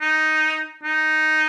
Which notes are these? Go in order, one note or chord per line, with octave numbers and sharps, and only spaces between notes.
D#4
D#4